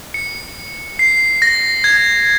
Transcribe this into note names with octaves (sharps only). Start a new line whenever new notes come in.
C#7
C7
A#6
G#6